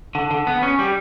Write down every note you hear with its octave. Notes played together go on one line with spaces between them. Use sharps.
D3
D3
B3
C#4
G3